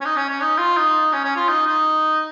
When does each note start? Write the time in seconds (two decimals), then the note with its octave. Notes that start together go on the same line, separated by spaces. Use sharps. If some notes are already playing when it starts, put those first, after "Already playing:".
0.01 C#4
0.05 D#4
0.16 C#4
0.29 C#4
0.41 D#4
0.58 F4
0.77 D#4
1.13 C#4
1.25 C#4
1.36 F4
1.49 D#4
1.67 D#4